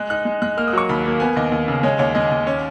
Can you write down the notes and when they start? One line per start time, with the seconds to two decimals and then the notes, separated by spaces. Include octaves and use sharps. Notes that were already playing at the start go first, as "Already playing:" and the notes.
Already playing: G#3 F#6
0.10 D#4 F#6
0.25 G#3
0.42 G#3 F#6
0.57 A#3 F6
0.68 D#6
0.73 F#3 C#6
0.89 D#2 B5
1.05 A#3
1.20 B3 G#5
1.36 D#2 D#5
1.52 D#2
1.68 C#3
1.83 G#3 C#5
1.99 D#2 C#5
2.15 G#3 D#5
2.31 D#2
2.47 C#4